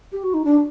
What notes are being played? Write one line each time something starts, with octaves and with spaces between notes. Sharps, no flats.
G4
F#4
D#4
D4